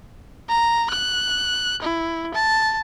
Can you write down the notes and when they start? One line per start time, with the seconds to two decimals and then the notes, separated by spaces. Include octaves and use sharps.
0.49 A#5
0.90 F#6
1.82 E4
2.34 A5